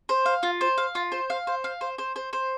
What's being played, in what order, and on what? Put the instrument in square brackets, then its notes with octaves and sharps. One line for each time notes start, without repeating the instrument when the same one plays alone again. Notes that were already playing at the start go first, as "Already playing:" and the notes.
[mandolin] C5
F5
F4
C5
F5
F4
C5
F5
C5
F5
C5
C5
C5
C5